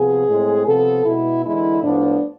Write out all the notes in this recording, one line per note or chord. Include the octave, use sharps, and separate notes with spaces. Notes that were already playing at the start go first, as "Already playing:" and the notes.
Already playing: C3 F3 B3 G#4
A2 G#3 C4
C3 F3 B3 A4
B2 G#3 B3 E4
E2 D3 G#3 E4
A2 F3 B3 D4